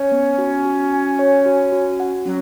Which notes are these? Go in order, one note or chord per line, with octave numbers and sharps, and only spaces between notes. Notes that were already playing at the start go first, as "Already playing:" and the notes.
Already playing: C#4 C#5
B3
F#4
F#4
G#5
C#5
F#4
F#4
F#5
F#3 C#4